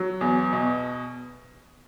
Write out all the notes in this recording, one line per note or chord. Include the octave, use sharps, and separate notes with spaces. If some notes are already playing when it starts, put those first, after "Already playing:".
Already playing: F#3
E2
B2